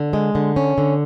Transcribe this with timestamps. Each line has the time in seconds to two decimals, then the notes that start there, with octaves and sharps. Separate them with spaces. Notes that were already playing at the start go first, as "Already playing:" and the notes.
Already playing: D3
0.13 G#3
0.35 D3
0.56 C#4
0.78 D3